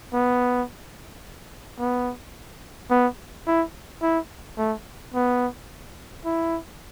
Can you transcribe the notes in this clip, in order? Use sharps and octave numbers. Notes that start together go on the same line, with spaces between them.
B3
B3
B3
E4
E4
A3
B3
E4